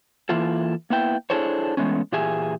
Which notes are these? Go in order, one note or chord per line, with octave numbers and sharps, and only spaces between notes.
E3 A#3 E4 F4 A4
A#3 B3 E4 G5
D4 E4 G#4 A4 C5 C#5
E3 F3 G#3 A3 B3 C#4
A#2 E3 G4 G#4 E5 G#5